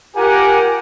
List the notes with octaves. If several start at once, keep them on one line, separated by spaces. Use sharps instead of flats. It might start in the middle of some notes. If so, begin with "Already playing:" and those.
F4 G4 A#4 F#5 G#5